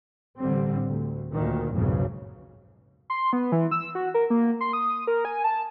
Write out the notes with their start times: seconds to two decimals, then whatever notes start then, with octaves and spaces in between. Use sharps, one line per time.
0.38 A1 D3 G3 C4
0.86 D2
1.32 D2 A#2 D#3
1.71 B1 F2 G#2 C#3
3.10 C6
3.33 B3
3.52 E3
3.71 E6
3.95 F#4
4.14 A#4
4.30 A#3
4.61 C6
4.73 D#6
5.07 A#4
5.25 G#5
5.44 A5